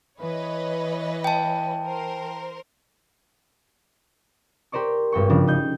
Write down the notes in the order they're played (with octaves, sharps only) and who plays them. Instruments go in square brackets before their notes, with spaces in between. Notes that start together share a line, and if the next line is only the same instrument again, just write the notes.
[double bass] E3 [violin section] B4 C#5 D#5
[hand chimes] G5 A5
[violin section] A#4 C5
[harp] G4 A#4 C5 D5 C#6
G#1 G2 G5 C#6
C#3 F3 D4
D#4 G6